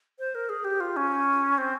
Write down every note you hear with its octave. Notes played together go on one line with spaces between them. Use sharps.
C5
A#4
G#4
G4
F4
C#4
C4